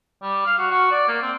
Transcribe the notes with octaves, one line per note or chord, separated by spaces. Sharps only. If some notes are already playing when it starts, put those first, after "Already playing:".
G3
F5
F#4
F#4
D5
A#3
C4